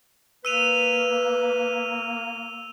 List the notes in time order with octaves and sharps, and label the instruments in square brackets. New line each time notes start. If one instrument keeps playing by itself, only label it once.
[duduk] A#3 [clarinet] B4 [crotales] E6 D#7 F7